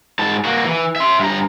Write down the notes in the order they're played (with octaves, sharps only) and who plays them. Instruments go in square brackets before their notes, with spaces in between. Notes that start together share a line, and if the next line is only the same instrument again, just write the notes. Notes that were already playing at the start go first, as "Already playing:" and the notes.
[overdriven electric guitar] G#2 A5
A#3 F#4
E3
E5 C6
G2 A#5